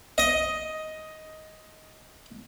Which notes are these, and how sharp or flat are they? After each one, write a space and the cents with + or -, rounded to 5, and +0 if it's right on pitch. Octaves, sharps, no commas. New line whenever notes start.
D#5 +10